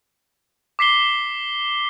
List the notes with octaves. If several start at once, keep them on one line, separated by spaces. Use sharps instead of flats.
D6 B6 C7 G7